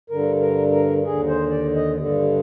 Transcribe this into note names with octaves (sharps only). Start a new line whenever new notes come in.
G2 D3 A#4
A#4
A#4
D#2 D3 G#4
C5
D5
D#5
G2 D3